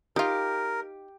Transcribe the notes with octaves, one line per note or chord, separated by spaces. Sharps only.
D#4 F4 G4 A#4